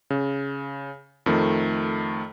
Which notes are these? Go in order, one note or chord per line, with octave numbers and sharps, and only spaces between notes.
C#3
F2 D#3 A3